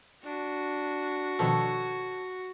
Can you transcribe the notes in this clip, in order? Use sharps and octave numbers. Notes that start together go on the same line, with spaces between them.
D4 F#4
B2 D#3 F3 A4 C#5